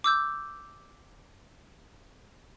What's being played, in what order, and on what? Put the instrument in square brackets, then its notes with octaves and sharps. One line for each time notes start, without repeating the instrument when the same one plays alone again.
[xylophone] D6 E6 G6